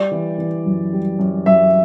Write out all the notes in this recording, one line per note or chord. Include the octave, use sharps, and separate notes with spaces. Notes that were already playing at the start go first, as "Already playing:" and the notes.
Already playing: G3 D5
E3
E3
F#2
G3
F#2
F#2 E5